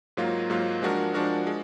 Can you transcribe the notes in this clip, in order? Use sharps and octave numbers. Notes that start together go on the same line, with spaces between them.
G#2 F#3 A#3 F4
G#2 F#3 A#3 F4
F3 G#3 D4 F#4 A#4
F3 G#3 D4 F#4 A#4
G#3